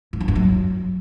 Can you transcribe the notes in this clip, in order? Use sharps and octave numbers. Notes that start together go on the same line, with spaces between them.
G#2
E3
G2
F#3